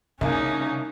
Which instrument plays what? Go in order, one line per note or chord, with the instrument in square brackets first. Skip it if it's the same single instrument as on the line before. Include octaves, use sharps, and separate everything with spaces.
[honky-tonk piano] C2 A#3 G#5 [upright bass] C#3 [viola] C#4 D#4